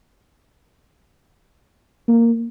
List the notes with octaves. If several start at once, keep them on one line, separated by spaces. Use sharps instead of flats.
A#3